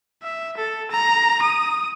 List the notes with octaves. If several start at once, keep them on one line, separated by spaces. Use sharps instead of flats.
E5
A4
A#5
D#6